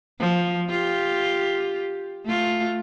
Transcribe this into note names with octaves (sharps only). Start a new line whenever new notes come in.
F3
F4 G4
A3 F4